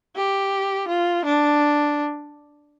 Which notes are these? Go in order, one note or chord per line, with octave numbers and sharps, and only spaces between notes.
G4
F4
D4